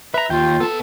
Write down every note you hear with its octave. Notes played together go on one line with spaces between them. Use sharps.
B4 E5 A#5
D#2 F4 G5
B3 A4 A5